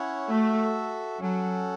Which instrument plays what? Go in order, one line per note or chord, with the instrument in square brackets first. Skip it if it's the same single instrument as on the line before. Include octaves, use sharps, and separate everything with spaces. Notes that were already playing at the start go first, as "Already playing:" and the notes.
Already playing: [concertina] C#4 E4 C#5 F#5
[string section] A3 [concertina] F#4 A4 E5
[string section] F#3 [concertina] C#4 A4 F#5